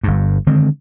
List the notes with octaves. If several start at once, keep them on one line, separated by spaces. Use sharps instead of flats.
G1 G2
D3 D#3 G#3 C4